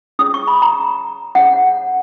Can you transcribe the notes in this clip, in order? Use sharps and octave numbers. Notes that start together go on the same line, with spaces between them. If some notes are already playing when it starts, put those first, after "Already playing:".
C#4 G#4 C#5 D#6
C#6
B5
A#5
C#4 G#4 C#5 F#5